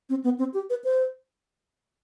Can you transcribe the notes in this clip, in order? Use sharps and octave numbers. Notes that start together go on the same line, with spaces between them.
C4
B3
C4
G4
B4
C5